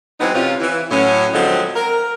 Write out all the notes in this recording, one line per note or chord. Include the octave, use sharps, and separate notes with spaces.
E3 F#3 G#3 B3 C4 D#4
C3 C#4 F4
E3
A2 F#3 C#4
D3 F3 F#3 G#3 C4 A4
A#4